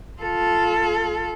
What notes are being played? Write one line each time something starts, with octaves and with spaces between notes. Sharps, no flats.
F4 A4